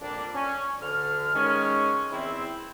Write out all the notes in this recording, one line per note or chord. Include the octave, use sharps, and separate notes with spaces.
F2 A#2 G3 A#3 D4
C#4
D2 D3 F6
D#3 G#3 C#4
E2 C4 E4